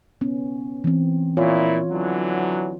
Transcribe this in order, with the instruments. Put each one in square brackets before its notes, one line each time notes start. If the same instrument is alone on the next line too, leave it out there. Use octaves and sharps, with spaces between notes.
[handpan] B3 C#4
E3 C4
[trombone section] A#2 E4 [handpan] F4 C#5
[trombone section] D3 E3 F#3